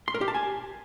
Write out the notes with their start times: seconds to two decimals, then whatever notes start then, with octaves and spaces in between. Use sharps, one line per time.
0.08 C6
0.14 A#4
0.21 G4
0.28 A5
0.35 G#5